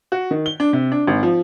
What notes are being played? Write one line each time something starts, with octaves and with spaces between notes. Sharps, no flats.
F#4
D#3
G7
D4
C3
D4
G#1
F3